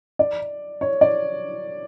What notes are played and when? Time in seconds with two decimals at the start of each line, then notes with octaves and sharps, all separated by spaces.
0.19 D5
0.81 C#5
1.01 D5